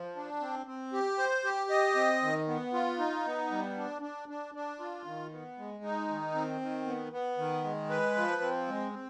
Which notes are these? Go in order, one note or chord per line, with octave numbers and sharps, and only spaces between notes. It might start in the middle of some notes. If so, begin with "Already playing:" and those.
Already playing: F3
D4
C4
C4
G4
C5
G4
D#5
C4
D#3
B3
F4
D#4
B3
G3
D4
D4
D4
D4
F4
D#3
B3
G#3
D#4
D#3
C4
D#3
B3
B3
D#3
G#3
B4
F3
C4
G#3
C4